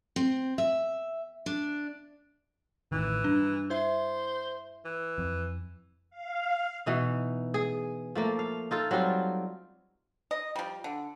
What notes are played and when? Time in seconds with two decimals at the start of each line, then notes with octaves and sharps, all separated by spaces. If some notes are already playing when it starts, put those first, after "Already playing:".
0.16 C4
0.58 E5
1.46 D4
2.92 A1 A2 D#3 E3
3.24 G2 D4
3.70 E4 C5 E5
4.85 E3
5.18 F2
6.10 F5
6.86 B2 E3 D#4
7.54 G#4
8.15 F3 A3 A#3
8.39 F5
8.71 D#4 F4 A4
8.91 F#3 G3 C4 F4
10.31 D#5
10.56 F3 G3
10.84 D3